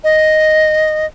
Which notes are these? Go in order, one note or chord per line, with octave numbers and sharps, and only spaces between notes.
D#5